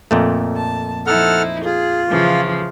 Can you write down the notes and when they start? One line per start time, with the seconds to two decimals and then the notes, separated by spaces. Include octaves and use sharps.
0.11 F2 A#2 A3
0.55 A5
1.07 F3 D#4 E4 A4 F#5 F6
1.65 F4 G#4
2.09 C#3 E3 F3